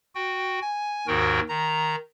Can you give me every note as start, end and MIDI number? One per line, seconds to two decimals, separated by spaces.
0.15 0.60 66
0.15 0.60 79
0.61 1.07 80
1.07 1.40 39
1.07 1.40 44
1.07 1.40 51
1.07 1.40 66
1.07 1.40 70
1.07 1.40 79
1.49 1.96 51
1.49 1.96 82